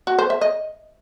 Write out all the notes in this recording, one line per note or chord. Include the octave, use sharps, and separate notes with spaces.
F#4
C5
E5
D#5